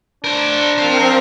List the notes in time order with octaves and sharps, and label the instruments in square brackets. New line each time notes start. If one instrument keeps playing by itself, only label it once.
[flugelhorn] D4 [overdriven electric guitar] A#4 C5
[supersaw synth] C4 A#4 [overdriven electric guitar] C5 F5